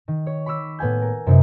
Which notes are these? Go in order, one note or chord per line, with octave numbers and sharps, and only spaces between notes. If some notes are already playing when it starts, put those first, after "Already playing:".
D#3
C#5
B5 C#6 D6 E6 B6
A2 B3 F#5 G#5 G6
A#4
F#2 C3 D#4